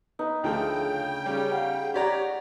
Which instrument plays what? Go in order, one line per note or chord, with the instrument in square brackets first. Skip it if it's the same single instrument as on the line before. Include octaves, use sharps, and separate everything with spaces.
[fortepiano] B3 [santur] D#4
[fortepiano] D2 F3 A3 [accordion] C#3 G5
[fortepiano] G3 C#4
[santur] F5 F#5 A#5
[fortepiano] G4 D5 A#5 [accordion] C#5 [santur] F#5 B5